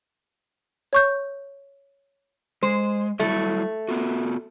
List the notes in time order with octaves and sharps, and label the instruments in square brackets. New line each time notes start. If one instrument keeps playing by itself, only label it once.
[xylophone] C#5 C#6 G6
[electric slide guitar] G#3 [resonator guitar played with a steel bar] C5
[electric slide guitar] F#3 G3 E4 [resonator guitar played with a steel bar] A3
[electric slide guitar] B3 F4 F#4